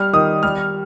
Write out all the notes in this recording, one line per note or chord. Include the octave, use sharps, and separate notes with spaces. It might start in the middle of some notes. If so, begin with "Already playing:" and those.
Already playing: G3 F6
D#3 D#6
G3 F6